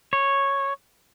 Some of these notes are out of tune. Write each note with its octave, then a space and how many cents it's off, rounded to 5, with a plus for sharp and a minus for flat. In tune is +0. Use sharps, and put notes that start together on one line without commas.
C#5 -5